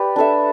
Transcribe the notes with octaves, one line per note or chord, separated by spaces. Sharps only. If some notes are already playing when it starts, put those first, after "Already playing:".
Already playing: G4 B4 D5
D4 A4 E5